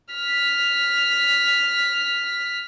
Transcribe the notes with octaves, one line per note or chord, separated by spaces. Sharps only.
F6 B6